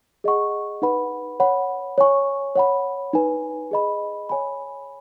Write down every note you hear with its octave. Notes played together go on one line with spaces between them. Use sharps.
G#4 D#5 F#5 C#6
D#4 B4 F#5 B5
C#5 F#5 B5
C#5 G#5 C#6
C#5 F#5 B5
D#4 B4 G#5
G#4 D#5 B5
C#5 G#5 B5